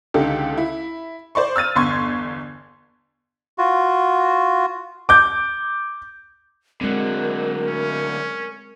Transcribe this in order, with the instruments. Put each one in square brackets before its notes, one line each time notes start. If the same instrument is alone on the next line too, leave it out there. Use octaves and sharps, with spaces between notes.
[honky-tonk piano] C#2 D3 D#4 G4 A4
E4
C5 D5 C6 C#6
E6 F6 A6 D#7
G1 E2 C6 C#6 G#6
[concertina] F4 F#4
[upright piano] D6 G6
[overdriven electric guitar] D3 F#3 [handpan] G#3 C4 [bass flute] A#4
[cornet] C#4